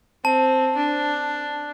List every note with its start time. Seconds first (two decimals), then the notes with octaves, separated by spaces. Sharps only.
0.25 C4 A5
0.77 D4